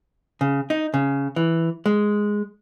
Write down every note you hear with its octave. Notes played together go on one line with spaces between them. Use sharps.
C#3
D#4
C#3
E3
G#3